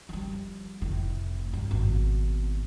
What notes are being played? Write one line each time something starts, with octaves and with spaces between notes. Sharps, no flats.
F3 G3
F1 A2
G2
G#1 B2